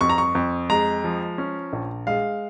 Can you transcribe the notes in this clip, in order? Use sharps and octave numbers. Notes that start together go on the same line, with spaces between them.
F2 C#6
A#5
C#6
F2
G#3 A#5
F3
C#4
A#1
G#3 F5